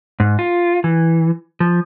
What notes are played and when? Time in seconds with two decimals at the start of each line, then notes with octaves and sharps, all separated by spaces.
0.20 G#2
0.39 F4
0.84 E3
1.60 F3